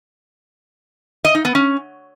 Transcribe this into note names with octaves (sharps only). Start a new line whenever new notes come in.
D#5
D#4
B3
C#4